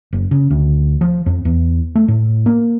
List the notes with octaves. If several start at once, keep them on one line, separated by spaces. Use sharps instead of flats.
F#1
C#3
D2
F3
F2
E2
A3
A2
A#3